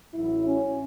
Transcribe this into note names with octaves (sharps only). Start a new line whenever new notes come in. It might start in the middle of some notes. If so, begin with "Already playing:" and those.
A1 A2 F#3 E4
C#4